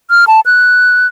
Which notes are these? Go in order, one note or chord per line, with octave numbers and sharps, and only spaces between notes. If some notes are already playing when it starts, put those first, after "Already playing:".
F6
A5
F#6